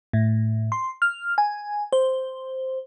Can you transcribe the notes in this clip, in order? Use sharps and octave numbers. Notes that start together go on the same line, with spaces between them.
A2
C6
F6
G#5
C5